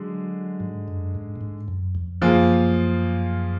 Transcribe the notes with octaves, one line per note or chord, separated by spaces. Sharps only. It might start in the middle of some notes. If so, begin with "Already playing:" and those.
Already playing: D3 F#3 G#3
G#2
F#2
G#2
A#2
G#2
F#2
F2
F#2 F3 A#3 F4 G#4